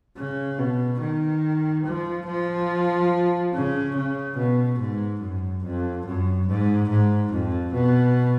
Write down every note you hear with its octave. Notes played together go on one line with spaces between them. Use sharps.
C#3
B2
D#3
F3
F3
C#3
C#3
B2
G#2
F#2
F2
F#2
G#2
G#2
F2
B2